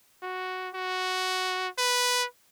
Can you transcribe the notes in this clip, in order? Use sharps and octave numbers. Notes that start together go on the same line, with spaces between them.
F#4
F#4
B4